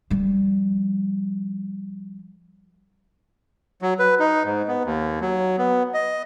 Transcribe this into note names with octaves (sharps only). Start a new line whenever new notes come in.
F3 G3
F#3
B4
D#4
G#2
B3
D#2
F#3
B3
D#5